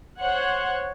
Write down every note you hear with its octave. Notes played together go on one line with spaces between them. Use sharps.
C5 C#5 F#5